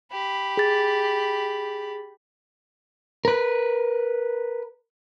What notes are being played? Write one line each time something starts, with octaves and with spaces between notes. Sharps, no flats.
G4 B5
G#4 A6
A#4 B4